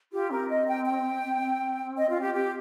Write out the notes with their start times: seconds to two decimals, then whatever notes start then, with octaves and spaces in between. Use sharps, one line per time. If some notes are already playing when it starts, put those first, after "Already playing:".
0.12 F4 G4
0.30 C4 A#4
0.50 D#5
0.67 G5
0.85 G5
1.23 C4
1.41 C4
1.97 D#5
2.09 F4
2.21 G4
2.33 C4 G4